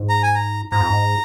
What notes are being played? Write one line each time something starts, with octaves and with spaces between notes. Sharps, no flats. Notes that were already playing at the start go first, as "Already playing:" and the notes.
Already playing: G#2
A#5
G#5
A#5
G#2 A#5
F2
G#2